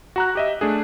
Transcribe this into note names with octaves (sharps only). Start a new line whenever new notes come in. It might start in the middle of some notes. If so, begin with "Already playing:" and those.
F#4 A#5 F#6
G4 D#5 E5
A3 D4 G#4